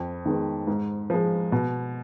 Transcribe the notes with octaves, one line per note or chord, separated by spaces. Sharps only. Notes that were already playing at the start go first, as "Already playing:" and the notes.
Already playing: F2
D#3 G#3 B3
G#2
F3 G#3
B2